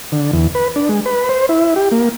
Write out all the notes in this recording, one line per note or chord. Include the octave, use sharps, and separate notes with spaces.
D3
E2
B4
D4
G#3
B4
C5
E4
G4
A#3